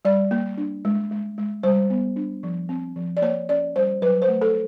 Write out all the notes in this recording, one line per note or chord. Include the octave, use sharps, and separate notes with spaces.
G3 D5
A#3
D4
G#3
G#3
G#3
G3 C5
B3
D4
F3
C4
F3
D5
A#3 C#5
C#4 D5
G3 C5
F#3 B4
C5
A3
A4